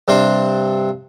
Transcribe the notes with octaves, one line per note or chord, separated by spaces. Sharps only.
G2 C3 C4 D4 C5